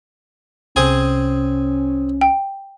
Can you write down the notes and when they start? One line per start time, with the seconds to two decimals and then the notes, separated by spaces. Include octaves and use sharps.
0.76 C2 C3 C4 C#4 G#4 G#5
2.21 G5